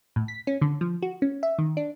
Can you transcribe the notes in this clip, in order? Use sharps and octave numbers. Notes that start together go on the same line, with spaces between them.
A2
B6
C#4
D3
F3
F#4
C#4
E5
D#3
D4